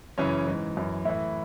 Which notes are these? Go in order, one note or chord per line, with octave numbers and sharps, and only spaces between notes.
F#2 C#3 E3 C#4
G#2 E3
F#2 E3
A2 E3 E4